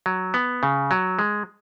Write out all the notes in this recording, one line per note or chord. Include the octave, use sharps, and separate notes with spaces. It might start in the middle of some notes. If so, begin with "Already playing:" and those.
F#3
B3
C#3
F#3
G#3